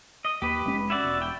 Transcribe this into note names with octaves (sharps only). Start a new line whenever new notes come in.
D#5
D#2 G4 B4
F1 G#3 C#4
E4 F#4 D5
E1
G5